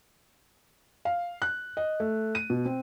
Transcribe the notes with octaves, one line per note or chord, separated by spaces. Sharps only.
F5
F#6
D#5
A3
D#7
B2
C4